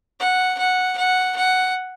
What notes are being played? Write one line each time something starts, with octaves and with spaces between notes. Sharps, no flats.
F#5
F#5
F#5
F#5